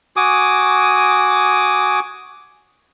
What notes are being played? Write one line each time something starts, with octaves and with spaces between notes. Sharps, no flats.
F#4 G#5 D6 D#6